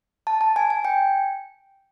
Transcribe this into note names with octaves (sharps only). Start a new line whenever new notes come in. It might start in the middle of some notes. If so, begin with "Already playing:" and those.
A5
A5
G#5
G#5
G5